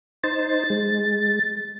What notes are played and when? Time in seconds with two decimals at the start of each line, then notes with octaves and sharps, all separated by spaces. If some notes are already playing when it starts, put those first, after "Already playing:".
0.24 D#4 C5 A6
0.70 G#3